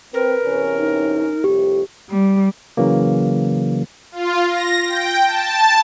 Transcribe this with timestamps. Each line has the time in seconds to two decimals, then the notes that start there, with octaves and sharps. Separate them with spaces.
0.14 C4 A#4 B4
0.45 E2 C3 C#4
0.78 D#4
1.44 C2 F2 A2 G4
2.08 G3
2.77 C#3 E3 F#3 A#3
4.12 F4
4.50 A#6
4.86 G5
5.26 A5